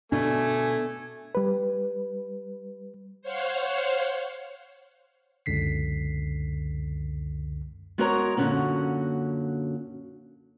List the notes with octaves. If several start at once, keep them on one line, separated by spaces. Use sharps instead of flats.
B2 A3 D4 G#5
G3 B4
C5 C#5 F5 F#5
C#2 F#2 D3 B6 C7
G#3 B3 F#4 A#4 C#5 A#5
F#2 A#2 D3 D#3 C#4 F#4